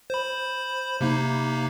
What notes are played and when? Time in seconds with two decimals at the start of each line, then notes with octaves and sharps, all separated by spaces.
0.10 C5 B5
1.01 C3 A#3 D#4